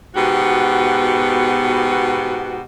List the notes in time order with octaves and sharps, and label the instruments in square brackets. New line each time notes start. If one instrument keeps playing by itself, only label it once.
[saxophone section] G#2 B2 B3 F#4 G4